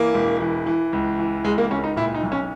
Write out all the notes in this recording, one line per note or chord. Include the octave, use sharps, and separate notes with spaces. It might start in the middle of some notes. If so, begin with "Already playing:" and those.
Already playing: E3 A#3
E1
E3
E3
C#2
E3
C#2 G#3
A#3
C#2 C#4
D#4
A#2 E4
D#4
B1
C#4